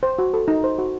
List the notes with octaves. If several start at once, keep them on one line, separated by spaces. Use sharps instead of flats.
C5
F#4
A4
D#4
C5
F#4